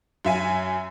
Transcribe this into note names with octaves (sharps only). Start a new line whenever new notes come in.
F#2 E5 G#5